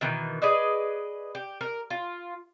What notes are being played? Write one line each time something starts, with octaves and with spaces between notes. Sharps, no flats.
B2 D#3 E3
G#4 B4 D5 D#5
G4
A#4
F4